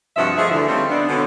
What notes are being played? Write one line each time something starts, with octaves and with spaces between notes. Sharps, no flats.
G2 C3 F3 F#4 D#5 E5
F3 A3 D4 G#4 E5
D2 D3 E3
G3 A3 C4 C#4 D#4 F4
B3 D4
B2 D3 C#4